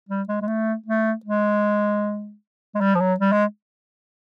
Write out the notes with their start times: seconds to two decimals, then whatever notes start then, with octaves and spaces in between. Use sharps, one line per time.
0.09 G3
0.28 G#3
0.41 G#3
0.47 A3
0.86 A3
1.25 G#3
2.75 G#3
2.81 G3
2.95 F3
3.00 F#3
3.20 G3
3.32 G#3